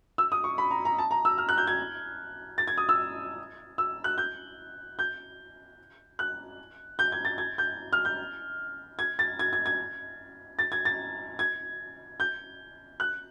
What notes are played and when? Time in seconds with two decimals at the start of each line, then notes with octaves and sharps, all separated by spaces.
0.18 E6
0.32 D#6
0.44 C#6
0.58 B5
0.71 A#5
0.85 A#5
0.99 A5
1.11 A#5
1.25 E6
1.38 F6
1.49 F#6
1.58 G6
1.67 G#6
2.58 A6
2.68 G#6
2.78 D#6
2.89 E6
3.78 E6
4.04 F#6
4.18 G6
4.99 G6
6.19 F#6
6.99 G6
7.12 G#6
7.25 A6
7.38 G#6
7.58 G6
7.93 F6
8.05 G6
8.99 G#6
9.19 A6
9.39 G#6
9.53 G#6
9.66 G#6
10.59 A6
10.72 G#6
10.85 A6
11.39 G#6
12.20 G6
13.00 F#6